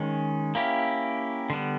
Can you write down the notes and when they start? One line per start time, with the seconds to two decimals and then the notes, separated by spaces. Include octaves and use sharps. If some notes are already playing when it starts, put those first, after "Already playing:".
Already playing: D#3 G#3 C#4
0.55 A#3 C#4 E4 G4
1.50 D3 G3 B3